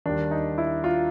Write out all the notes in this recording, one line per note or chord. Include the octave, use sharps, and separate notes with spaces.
D#2 D#3 G3 D4
D#4
E4
F4